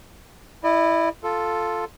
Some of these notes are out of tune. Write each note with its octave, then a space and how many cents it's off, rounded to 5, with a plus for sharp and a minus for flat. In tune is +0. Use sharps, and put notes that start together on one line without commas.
E4 +0 D#5 -45
F4 +0 A4 +0